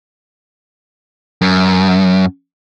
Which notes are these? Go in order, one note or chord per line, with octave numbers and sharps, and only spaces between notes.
F#2